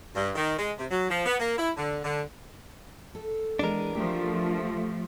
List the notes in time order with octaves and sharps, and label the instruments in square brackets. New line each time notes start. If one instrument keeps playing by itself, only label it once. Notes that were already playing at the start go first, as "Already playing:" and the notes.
[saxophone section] G2
D#3
G#3
C3
F#3
F3
B3
A#3
E4
D3
D3
[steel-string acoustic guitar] A4
[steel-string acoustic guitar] E3 G#3 B3 [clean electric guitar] D4 A#4
[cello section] F3 A3 [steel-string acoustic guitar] G4